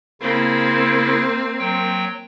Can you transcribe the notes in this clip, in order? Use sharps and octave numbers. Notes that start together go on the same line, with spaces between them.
C#3 A#3 C4 E4
F#3 G5